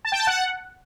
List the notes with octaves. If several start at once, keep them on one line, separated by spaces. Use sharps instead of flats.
A5
G5
A5
F#5